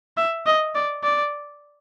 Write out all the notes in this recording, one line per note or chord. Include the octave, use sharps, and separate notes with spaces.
E5
D#5
D5
D5